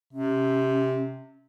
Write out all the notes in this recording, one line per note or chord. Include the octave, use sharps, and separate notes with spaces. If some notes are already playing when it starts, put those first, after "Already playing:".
C3 C#4